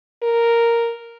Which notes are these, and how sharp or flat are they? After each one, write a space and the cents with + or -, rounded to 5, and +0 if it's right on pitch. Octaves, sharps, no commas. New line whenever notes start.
A#4 +0